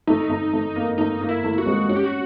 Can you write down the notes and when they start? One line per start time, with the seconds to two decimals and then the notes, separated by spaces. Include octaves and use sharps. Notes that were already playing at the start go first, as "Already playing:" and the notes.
0.07 A3 D#4
0.30 A3
0.53 A3
0.76 A#3
0.98 A3 D#4
1.21 A#3
1.29 E4
1.44 A3
1.58 F#4
1.66 G#3
1.89 C#4 F#4
1.96 G4
2.04 F#4